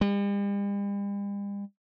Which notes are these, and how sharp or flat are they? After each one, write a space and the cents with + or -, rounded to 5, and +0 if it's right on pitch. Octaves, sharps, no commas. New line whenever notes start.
G3 +45